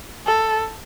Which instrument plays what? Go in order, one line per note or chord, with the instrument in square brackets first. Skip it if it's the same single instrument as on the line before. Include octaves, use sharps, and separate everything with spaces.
[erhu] A4